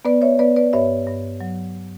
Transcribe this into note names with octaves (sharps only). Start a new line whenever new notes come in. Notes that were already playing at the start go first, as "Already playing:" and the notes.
B3 B4 D5
C#5 E5
B3 B4 D5
B4 D5
G2 C#5 E5
G2
F#3